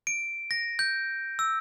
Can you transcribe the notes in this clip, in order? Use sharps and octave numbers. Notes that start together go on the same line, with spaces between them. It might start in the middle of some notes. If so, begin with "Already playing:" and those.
D7
A#6
G6
E6